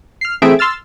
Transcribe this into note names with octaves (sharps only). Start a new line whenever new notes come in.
F6 C7
E3 A3 C4 G#4 E5 D7
C6 E6 F6 A6